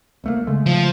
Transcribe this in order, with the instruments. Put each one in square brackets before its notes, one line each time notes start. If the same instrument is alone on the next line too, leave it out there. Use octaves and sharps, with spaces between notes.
[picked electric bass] C2 A3 A#3
C#3 G#3 A3
[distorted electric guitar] F3